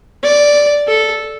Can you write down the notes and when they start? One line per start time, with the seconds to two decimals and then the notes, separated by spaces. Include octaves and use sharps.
0.23 D5
0.88 A4